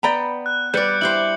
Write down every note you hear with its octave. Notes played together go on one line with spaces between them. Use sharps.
B3 D5 G5 A#5 B5
F#6
G3 B4 D5 G6 C#7
E4 G4 C5 F#7